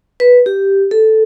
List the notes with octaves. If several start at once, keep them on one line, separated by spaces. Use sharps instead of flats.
B4
G4
A4